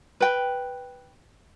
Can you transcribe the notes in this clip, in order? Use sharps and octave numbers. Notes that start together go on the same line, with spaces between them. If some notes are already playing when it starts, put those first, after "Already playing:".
B4 G5